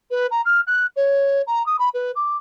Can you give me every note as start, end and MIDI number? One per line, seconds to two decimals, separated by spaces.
0.11 0.27 71
0.31 0.42 82
0.45 0.61 89
0.67 0.86 90
0.96 1.42 73
1.47 1.66 82
1.66 1.77 87
1.79 1.89 83
1.94 2.12 71
2.16 2.37 86